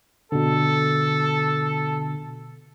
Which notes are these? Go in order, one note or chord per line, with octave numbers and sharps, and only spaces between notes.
B2 D3 A4